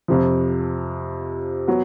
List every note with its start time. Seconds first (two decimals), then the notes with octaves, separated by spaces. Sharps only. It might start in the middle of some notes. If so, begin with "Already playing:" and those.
0.08 F2 C3 F3
1.68 F#3 B3